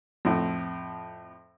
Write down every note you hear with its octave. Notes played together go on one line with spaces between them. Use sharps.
F2 A2